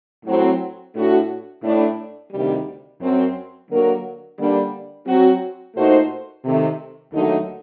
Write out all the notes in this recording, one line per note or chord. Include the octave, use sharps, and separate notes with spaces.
A2 F#3 C4
A2 A3 D4 F#4
A2 A3 D4
D2 C3 D#3 G3
F#2 F#3 C4
D3 F#3 A#3 F#4 A#4
D3 G3 A#3 D4
F#3 C4 F#4
A#2 A3 D#4 F#4 C5
C3 D#3 A3
D#2 D3 F#3 A3 D#4